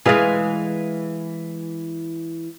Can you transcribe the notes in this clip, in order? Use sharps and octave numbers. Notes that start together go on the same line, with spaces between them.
E3 G#3 G#4 B4 F5